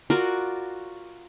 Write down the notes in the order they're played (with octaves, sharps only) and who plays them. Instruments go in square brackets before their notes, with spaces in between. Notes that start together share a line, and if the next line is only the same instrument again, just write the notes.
[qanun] F4 F#4 A#4 D5